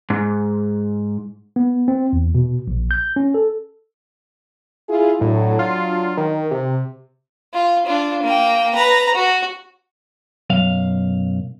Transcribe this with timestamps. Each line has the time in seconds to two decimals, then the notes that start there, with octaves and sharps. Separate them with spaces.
0.10 G#2
1.56 B3
1.88 C4
2.13 E2
2.35 B2
2.67 A#1
2.91 G6
3.16 C#4
3.34 A4
4.89 E4 F4 G#4
5.21 A2 F#3 D4
5.59 F4
6.17 D#3
6.51 C3
7.54 F4
7.86 D4 F4
8.23 A#3 G5
8.75 B4 A#5
9.15 F#4
10.50 B1 F#2 F5